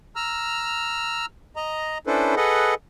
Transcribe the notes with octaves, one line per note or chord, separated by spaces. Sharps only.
A#5 E6 F6
D#5 A#5
C#4 D4 E4 A4 B4 C5
G#4 A4 B4 D#5 F#5